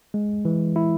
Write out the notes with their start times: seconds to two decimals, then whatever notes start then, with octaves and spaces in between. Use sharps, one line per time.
0.14 G#3
0.45 E3
0.76 E4